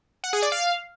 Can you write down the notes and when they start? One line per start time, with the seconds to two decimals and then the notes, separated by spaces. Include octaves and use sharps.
0.24 F#5
0.33 G#4
0.42 D5
0.52 F5